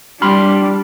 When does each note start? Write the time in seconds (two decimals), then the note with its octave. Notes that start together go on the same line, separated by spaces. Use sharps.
0.22 G3 D4 B5 C6 F6